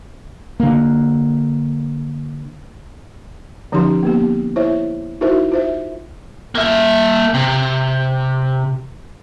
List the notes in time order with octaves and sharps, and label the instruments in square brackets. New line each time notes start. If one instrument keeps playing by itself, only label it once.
[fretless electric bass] D3 A#3
[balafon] D3 F3 C#4 D#4 G4 C6
A#3 B3 G4
E4 C5 C#5 E5
D#4 E4 F#4 A#4 C5 E5
F4 C5 E5
[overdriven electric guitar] A#3 E5
C3